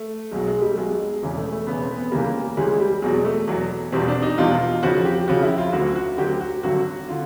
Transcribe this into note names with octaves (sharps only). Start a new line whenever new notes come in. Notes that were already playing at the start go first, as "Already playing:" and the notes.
Already playing: A3
B1 B2 F#3 G#3
G#3
G3
A3
B1 B2 F#3 G#3
E1 E2 C#3 E3 G#3
A3
A3
E1 E2 C#3 E3 B3
C4
B3
C#2 C#3 E3 G3 A#3
C#2 C#3 E3 G3 G#3
G3
E2 B2 F#3 G#3
A3
E2 B2 F#3
E1 E2 B2 G3 C4
D4
D#4
E1 E2 B2 G3 F4
F2 C#3 F3 F#4
G4
F2 C#3 F3 F#4
E4
F4
D2 D3 F#3 F#4
F#4
D2 D3 F#3 G4
F#4
G#1 G2 D3 F#3 F#4
D3 F4